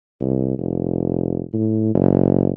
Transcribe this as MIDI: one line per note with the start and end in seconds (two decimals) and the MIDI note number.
0.21 0.55 36
0.59 1.42 29
1.53 1.91 45
1.94 2.50 30